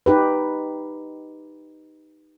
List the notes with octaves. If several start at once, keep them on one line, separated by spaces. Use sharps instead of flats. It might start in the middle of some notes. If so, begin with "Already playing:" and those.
D#4 G4 B4